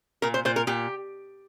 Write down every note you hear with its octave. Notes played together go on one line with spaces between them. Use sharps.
A#2 A#4
C5
A#2 C5
A#4
A#2 G4